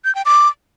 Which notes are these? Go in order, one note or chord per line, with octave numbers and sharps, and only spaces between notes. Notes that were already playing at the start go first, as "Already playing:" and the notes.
G6
G5
D6